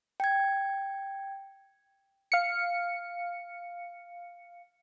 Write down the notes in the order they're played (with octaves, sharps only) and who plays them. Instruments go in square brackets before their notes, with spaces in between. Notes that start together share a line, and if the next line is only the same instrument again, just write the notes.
[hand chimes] G5 G#6
[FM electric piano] F5 C#7